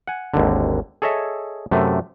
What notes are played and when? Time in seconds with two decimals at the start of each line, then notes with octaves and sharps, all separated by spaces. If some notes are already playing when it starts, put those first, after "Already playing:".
0.07 F#5 G#5
0.34 G#1 D#2 D3
1.02 G#4 A4 C#5 D#5 E5
1.71 F#2 C3 A3